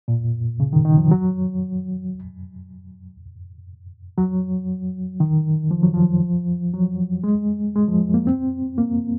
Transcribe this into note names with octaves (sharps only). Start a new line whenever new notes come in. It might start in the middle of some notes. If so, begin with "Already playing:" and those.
A#2
C#3
D#3
D#3
F3
F#3
F#3
D#3
F3
F#3
F3
F#3
G#3
G#3
F3
A#3
C4
A#3